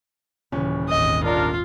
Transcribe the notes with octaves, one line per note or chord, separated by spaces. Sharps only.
D#1 C#3 E3 C#4
G#1 D#2 D#5
C#3 D4 F4 A#4